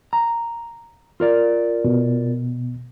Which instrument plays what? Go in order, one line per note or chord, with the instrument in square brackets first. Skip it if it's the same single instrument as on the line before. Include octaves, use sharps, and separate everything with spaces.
[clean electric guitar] A#5
F4 A#4 D5
[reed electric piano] B2